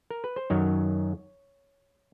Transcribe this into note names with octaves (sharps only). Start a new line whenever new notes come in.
A#4
B4
C5
F#2 D#3 F#3 C#5